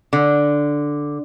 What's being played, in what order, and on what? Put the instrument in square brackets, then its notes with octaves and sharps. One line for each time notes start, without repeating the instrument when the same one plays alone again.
[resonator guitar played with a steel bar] D3